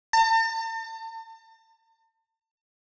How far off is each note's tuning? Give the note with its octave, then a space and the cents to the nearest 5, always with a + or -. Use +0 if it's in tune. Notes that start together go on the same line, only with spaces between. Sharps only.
A5 +45